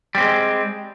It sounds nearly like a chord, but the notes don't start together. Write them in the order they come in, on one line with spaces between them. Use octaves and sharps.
G3 C4 G#3